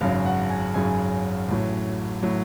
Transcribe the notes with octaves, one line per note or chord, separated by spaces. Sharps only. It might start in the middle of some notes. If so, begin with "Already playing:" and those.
G#1 F#2 C#3 F#3 F5
F#5
G#5
G#1 F#2 C#3 F#3 G#5
A1 A2 F#3
A2 F#3